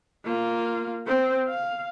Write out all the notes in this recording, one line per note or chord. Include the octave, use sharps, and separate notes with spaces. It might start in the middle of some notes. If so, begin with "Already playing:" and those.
A#3 F4
C4 C5
F5